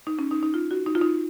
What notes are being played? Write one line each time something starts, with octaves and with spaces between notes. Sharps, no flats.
D#4
C#4
D#4
D#4
F4
F#4
D#4
F4
D#4